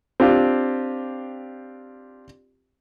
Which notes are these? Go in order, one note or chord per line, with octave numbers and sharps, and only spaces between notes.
C4 D4 F4 G4